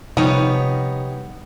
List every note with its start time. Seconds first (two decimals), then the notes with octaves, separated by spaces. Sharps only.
0.17 C3 F3 G3 B3 D#4 C#5